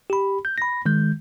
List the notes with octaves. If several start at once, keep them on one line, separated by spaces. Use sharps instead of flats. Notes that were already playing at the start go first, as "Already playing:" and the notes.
G4 B5
G6
B5 A#6
D#3 G#3 G6